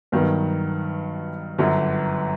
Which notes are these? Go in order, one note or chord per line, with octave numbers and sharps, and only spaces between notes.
G2 D#3 F#3 B3
G1 F#2 D3 F#3